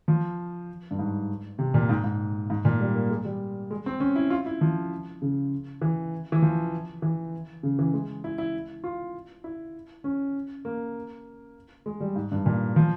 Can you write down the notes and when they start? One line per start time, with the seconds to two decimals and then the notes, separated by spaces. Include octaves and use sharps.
0.08 F3
0.91 G2
0.99 G#2
1.59 C3
1.74 A#2
1.89 G#2
2.04 G#2
2.50 G#2
2.65 A#2
2.81 G3
2.95 A#3
3.11 G#3
3.25 G3
3.71 G#3
3.86 C4
4.00 C#4
4.16 E4
4.30 F4
4.46 E4
4.61 F3
5.22 C#3
5.82 E3
6.32 E3
6.42 F3
7.02 E3
7.63 C#3
7.79 E3
7.93 G#3
8.24 E4
8.38 E4
8.84 F4
9.44 E4
10.04 C#4
10.65 A#3
11.86 G#3
12.00 G3
12.16 G#2
12.32 G2
12.46 A#2
12.76 F3